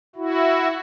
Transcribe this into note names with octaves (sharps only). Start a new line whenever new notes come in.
E4 F#4